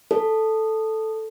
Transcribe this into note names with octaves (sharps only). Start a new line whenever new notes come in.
A4